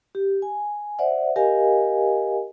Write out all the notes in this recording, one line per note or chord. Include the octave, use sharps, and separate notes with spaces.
G4
G#5
C5 D5 E5 F#5
G4 A#4 D#5 F5 G#5